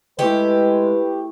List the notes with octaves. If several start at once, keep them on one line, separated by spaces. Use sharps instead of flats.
G#3 A3 E4 G4 B4